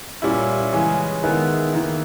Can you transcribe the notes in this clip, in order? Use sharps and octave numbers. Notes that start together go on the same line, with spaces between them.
A#2 G3 C#4 E4
C#3 E3 G#3 C#4
D#3 G#3 B3 E4
D#3 A#3 E4